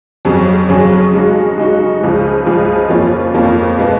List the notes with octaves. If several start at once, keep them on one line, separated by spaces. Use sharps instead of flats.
F2 C#3 F#3 C#4 G#4
F2 C#3 F#3 C#4 G#4
C#3 G#3 D#4 F#4
C#3 G#3 D#4 F#4
C#2 C#3 F3 G#3
C#2 C#3 F3 G#3
F2 F3 A#3 C#4 F4
F2 F3 A#3 C#4 F4
B2 G#3 B3